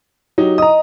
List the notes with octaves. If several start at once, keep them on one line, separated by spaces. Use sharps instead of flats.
F#3 D#4 G4
D#5 A#5 D#6